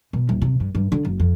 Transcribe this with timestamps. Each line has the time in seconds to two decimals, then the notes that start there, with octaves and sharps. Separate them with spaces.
0.13 B2
0.29 D#1
0.42 C3
0.60 G2
0.75 G2
0.92 D3
1.05 F#1
1.20 F2